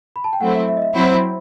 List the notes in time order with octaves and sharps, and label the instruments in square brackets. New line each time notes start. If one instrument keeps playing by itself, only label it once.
[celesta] B5
A5
G5
[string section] F#3 A3 C4 E4 [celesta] F#5
[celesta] E5
E5
D#5
E5
[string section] F#3 C4 E4 [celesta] F#5